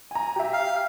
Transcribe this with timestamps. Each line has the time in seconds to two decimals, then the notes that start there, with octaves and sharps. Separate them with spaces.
0.11 G#5 A#5
0.36 G4 E5
0.53 F5